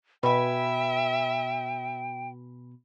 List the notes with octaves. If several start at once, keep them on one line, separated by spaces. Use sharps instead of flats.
B2 B4 E5 G5 G#5